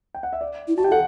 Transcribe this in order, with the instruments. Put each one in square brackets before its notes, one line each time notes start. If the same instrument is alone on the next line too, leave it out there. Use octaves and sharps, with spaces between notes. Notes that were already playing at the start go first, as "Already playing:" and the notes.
[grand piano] G5
F#5
E5
D5
[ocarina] E4
[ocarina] F#4 [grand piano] A5
[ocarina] G4 [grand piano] G5
[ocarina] A4 [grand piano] F#5